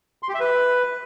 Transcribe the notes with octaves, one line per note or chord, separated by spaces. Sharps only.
C6
G4
E5
B4